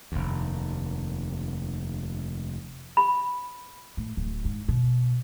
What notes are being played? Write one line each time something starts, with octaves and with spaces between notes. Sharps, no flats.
F1 D#2
B5
A2
D1
G#2
B2